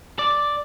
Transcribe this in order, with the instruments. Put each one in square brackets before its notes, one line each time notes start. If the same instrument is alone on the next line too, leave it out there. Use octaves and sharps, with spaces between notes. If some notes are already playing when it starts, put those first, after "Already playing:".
[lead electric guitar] D5